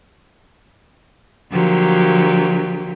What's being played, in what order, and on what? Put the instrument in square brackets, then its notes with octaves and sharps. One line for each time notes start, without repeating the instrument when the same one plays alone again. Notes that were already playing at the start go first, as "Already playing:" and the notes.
[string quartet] D3 F3 F#3 A#3 G4